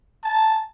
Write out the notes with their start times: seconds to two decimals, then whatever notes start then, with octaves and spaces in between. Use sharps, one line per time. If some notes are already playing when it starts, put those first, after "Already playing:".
0.24 A5